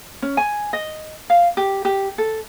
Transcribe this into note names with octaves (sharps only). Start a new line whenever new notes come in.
C#4
G#5
D#5
F5
G4
G4
A4